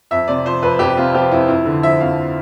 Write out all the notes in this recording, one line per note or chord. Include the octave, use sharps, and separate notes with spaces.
F2 E5
C3 D5
F3 C5
F2 B4
F2 G4
C3 F4
F3 G4
F2 E4
F2 E4
D3
F3 E5
F2 F5